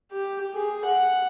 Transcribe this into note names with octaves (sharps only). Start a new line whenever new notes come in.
G4
G#4
F#5